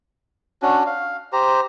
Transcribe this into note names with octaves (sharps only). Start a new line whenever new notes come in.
C#4 D4 F#4
F5
G4 C5 A#5